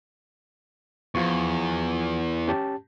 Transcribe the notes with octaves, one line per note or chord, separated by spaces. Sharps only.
E2 F3 F4 C#6
C#4 G4 A5